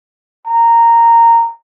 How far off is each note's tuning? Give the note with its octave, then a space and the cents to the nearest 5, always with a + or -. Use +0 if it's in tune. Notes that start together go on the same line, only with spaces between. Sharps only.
A#5 -10